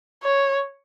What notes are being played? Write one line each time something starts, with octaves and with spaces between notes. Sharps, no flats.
C#5